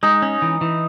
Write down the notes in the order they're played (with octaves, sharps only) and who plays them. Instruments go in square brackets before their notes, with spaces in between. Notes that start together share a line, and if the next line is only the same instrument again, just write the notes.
[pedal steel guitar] G#3 [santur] D#4
[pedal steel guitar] C#4
E3
E3